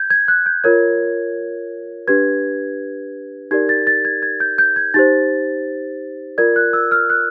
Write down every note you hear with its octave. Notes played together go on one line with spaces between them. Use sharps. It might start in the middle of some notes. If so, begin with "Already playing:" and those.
Already playing: G6 G#6
G#6
F#6
G6
F4 A#4 C#5 G#6
D4 G4 B4 G#6
D#4 G4 A#4 D5 G#6
A6
A6
G#6
G#6
G6
G6
G#6
D#4 G4 C5 A6
F4 A#4 D5 G#6
F#6
E6
F6
F#6